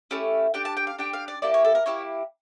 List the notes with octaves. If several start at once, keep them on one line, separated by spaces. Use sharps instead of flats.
A3 C#4 E4 G4
D4 G4 G5
A5
G5
F5
D4 G4 G5
F5
D5
A#3 E4 G4 D5
C#5
A4
A#4
A#3 E4 G4 C#5